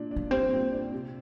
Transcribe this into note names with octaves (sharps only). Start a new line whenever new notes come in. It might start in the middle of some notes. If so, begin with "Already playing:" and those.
Already playing: A#2 D4
D4
A#3
G3 C4
A#2
D4
C3